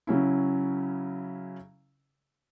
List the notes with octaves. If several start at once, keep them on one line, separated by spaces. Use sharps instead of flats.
C#3 F#3 C#4 E4